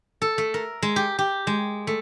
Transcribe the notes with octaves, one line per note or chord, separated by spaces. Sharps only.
A4
A3
A#4
G#3
G4
G4
G#3
A3